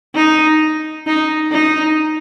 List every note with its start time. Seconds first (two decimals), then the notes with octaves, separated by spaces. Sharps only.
0.15 D#4
1.07 D#4
1.52 D#4